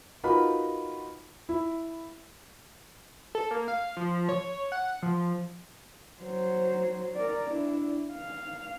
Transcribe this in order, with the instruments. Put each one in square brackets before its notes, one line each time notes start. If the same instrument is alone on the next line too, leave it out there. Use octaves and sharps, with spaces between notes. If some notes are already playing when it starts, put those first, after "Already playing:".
[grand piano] D#4 F4 F#4 A#4 B4 B5
E4
[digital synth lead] A4
A#3
F5
F3
C#5
F#5
F3
[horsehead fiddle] F#3 C5
A#4 D5
D4 E4
F5